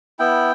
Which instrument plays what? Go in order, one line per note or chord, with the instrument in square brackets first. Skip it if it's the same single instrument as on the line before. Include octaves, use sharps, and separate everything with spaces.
[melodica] B3 E4 G5